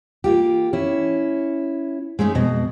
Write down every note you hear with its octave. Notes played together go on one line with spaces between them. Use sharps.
A#3 F4 G4
C#4 E4
G#3 A3 C#4 D#4
F2 B2 G#3 D#5